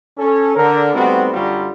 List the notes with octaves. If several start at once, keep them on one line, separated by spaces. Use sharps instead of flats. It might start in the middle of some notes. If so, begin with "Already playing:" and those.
C#4 A4
D3 A#4
G3 A3 B3 C4 D#4 F#4
F#2 D3 F#3 G3 F4